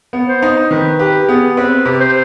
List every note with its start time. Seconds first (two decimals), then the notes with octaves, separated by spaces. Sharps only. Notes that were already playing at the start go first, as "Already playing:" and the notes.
0.13 B3
0.27 C5
0.42 D#4
0.71 D#3 B4
0.99 G4 B4
1.28 B3 G#4
1.57 C4 B4
1.85 C3
2.00 C5